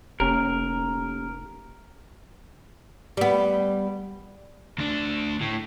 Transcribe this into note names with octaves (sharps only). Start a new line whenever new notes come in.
F1 A#3 C#4 G4 A#4
G3 B3
D2 D4
A2